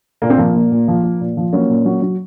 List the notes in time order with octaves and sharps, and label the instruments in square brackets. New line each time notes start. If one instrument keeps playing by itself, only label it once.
[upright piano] A#2 A#3
C4
F3 A#3
A#2
A#2
F3
F3
A#2
F3
F#3 A#3 C#4
A#2
F#3
F#3